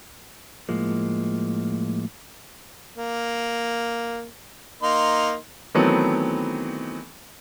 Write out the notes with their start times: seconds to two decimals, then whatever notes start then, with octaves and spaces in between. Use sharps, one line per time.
0.69 A2 F3 G#3 A#3
2.96 A#3
4.82 A#3 D#4 C6
5.75 D#3 E3 F#3 A3 B3 C4